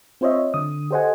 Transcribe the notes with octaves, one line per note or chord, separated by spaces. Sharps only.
C4 F4 C5 C#5 D#5 E5
D3 D#6
G4 A4 C5 D#5 F#5 G#5